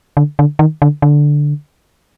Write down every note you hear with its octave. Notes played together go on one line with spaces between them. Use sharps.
D3
D3
D#3
D3
D3